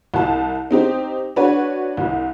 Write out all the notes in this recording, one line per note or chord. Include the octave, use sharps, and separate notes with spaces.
C2 A5
C4 D#4 G4 C5
D4 F#4 B4 C#5
C2